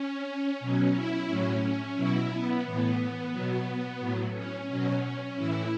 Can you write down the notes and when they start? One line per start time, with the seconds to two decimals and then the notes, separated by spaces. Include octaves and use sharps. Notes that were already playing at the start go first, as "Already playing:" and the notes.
Already playing: C#4
0.60 B2 F#3 C#4
0.94 E4
1.28 A2 F#3 C#4
1.62 C#4
1.97 B2 F#3 E4
2.30 B3
2.64 A2 E3
3.32 B2 F#3
4.00 A2 F#3
4.34 C#4
4.68 B2 F#3 C#4
5.02 C#4
5.36 A2 E3 E4